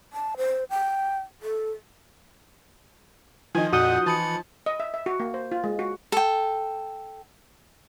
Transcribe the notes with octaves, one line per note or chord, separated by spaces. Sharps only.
A5
C5
G5
A4
D#3 F3 D#4 G#5
F2 A#2 F#4 F#5 D#6 G6
E3 A5 B5 C#7
D#5
E5
E5
F#4
A#3
C5
F4
G#3
F#4
A4 G5